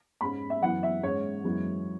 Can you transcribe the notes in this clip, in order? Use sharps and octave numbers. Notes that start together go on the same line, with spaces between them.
G#2 G#3 C#4 B5
E5
F#2 E3 B3 F#5
E5
G#2 G#3 C#4 C#5
F#2 E3 G#3 B3